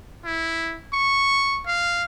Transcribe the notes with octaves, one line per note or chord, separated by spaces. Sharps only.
E4
C#6
F5